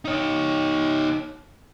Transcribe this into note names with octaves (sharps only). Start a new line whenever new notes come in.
D#4 C#5